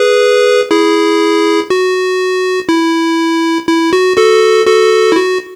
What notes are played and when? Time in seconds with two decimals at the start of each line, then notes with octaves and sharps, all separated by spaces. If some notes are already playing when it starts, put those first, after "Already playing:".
Already playing: G#4 B4
0.70 E4 G#4
1.70 F#4
2.69 E4
3.68 E4
3.93 F#4
4.17 F#4 A4
4.66 F#4 A4
5.12 E4
5.16 F#4